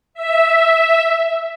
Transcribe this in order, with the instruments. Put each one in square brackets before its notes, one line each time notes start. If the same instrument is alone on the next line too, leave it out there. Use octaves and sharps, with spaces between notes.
[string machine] E5